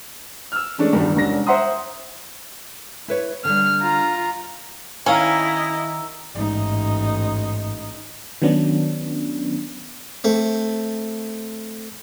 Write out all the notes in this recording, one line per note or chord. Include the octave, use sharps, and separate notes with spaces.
E6 F6
E3 G#3 A3 C#4 D4
E2 G2 D#3 F#3 G3
E1 C2 C#4 D4 A#6
C5 E5 F#5 A#5 C6 D#6
E4 B4 C#5
D3 G3 F6
F4 A#5
D#3 C#4 E4 D#5 F5 A#5 E6
A1 G#2 D#4
D#3 F#3 B3 C#4 D4
A3 C4